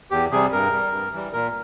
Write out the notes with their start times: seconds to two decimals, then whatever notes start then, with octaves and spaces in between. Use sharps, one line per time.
0.11 E2 G4
0.31 C3 G3 G#4
0.52 G2 A#4
0.72 G3
0.92 G2
1.12 E3 G3
1.33 A#2 A#4